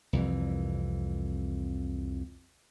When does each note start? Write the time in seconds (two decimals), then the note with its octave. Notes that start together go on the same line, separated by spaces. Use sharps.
0.13 C2 F2 E3